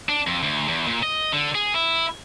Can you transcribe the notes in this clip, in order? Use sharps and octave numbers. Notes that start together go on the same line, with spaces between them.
D4
F2
D2
E2
A#2
D#5
D3
G#4
E4